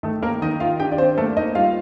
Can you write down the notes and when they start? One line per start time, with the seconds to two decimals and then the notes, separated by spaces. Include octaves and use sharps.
0.03 D#3 A3 A4
0.23 A#3 A#4
0.42 D#3 D#4 D#5
0.60 F4 F5
0.80 D4 G4 G5
0.92 D5
0.98 C4 C5
1.17 A3 A#3 A4
1.37 D#4 D#5
1.55 G3 F4 F5